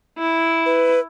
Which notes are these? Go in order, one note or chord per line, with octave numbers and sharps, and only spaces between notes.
E4
B4